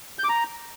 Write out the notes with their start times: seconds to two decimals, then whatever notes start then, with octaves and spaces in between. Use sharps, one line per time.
0.19 G6
0.24 D6
0.29 A#5